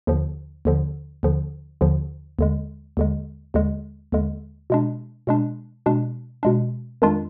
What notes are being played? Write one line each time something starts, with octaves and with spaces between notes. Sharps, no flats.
D#2 D3 F3
D#2 D3 F3
D#2 D3 F3
D#2 D3 F3
D#2 D3 G#3
D#2 D3 G#3
D#2 D3 G#3
D#2 D3 G#3
B2 G#3 D4
B2 G#3 D4
B2 G#3 D4
B2 G#3 D4
F2 D#3 G#3 D4 F4